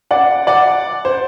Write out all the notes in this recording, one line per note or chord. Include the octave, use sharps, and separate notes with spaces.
D5 F#5
D5 F#5
C5